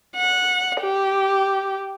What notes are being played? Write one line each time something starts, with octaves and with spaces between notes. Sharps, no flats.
F#5
G4